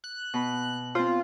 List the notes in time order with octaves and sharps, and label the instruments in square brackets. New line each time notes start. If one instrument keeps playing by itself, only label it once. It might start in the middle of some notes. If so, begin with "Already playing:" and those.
[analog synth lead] F#6
[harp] B2 B5
[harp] C4 C5 [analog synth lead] F4